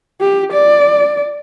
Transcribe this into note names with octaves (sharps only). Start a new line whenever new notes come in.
G4
D5